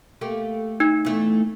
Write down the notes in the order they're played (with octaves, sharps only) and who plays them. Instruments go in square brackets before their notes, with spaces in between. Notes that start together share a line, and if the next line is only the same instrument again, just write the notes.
[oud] A3 A#3 G4
[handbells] D#4
[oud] E2 A3